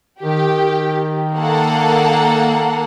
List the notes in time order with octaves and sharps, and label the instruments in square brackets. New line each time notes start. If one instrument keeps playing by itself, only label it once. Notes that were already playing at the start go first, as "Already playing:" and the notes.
[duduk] D#3 [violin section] G4
[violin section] A#3 A4 F#5